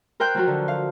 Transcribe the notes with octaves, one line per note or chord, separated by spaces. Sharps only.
A#4 C5 G5 F#6 G6
F3 F#3 F#4
D3
F5